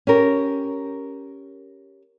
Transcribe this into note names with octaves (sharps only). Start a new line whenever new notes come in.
C#4 G4 A#4